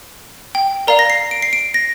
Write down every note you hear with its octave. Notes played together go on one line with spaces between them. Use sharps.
G5
A#4 D5 F5 A#5
A#6
C7
D7
C7
D7
A#6